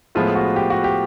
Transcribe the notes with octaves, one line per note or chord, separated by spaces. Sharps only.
A2 F3 G#3 B3 F4
F#4
G4
F#4
G4